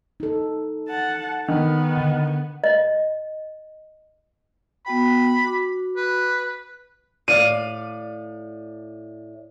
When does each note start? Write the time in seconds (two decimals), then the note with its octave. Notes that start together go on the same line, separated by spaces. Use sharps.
0.20 D#4 A4
0.89 F#5 A5
1.48 D#3 B3
1.97 D3
2.64 D#5
4.86 B3 F#4 G5 B5
5.44 F#4 D6
5.97 B4
7.28 A2 D5 F5 D#7